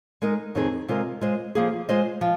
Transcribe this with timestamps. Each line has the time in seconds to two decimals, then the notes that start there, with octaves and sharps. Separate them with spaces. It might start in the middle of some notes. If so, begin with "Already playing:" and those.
0.22 G#3 D#4 A#4 D#5
0.55 F2 D#3 C4 D#4 G#4
0.88 C3 G#3 F4 A#4 D#5
1.21 G#3 F4 C5 D#5
1.55 F3 A#3 G#4
1.89 G#3 F4 C5 D#5
2.21 F3